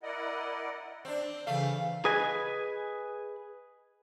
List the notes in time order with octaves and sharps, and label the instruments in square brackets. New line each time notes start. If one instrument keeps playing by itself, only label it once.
[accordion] E4 A#4 D5 D#5 F#5
[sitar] C4 D4
[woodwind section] C#3 E3 [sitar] A3 [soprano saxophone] F5
[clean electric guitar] G#4 B4 D#5 G#5